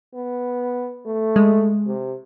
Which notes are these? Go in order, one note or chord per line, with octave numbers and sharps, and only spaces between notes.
B3
A3
G#3
C3